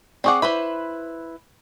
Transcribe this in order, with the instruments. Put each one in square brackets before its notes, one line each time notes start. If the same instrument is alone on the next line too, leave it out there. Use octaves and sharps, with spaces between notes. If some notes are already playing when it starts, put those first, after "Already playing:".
[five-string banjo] C4 G#4 F#5 [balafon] D5 C#6 D6
[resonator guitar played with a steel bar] E4 B4 [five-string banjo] C5 B5